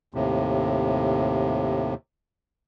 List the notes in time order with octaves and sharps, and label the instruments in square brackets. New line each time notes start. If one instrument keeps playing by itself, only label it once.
[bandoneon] D#2 A2 C3